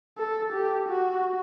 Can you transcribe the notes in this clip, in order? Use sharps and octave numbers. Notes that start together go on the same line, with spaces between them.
A4
G4
F#4